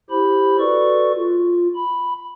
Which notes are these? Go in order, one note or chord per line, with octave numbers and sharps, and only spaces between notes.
E4 G4 C5 B5
F#4 A4 B4 D5 C#6
F4
B5